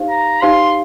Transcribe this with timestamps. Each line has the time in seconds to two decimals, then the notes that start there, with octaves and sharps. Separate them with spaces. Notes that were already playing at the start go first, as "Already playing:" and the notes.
Already playing: D#4 G4 C5 F5
0.10 A#5
0.42 D#4 G4 C5 F5 C6